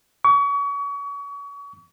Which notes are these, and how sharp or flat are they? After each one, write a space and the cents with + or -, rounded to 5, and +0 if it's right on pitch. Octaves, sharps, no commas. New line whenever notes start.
C#6 +35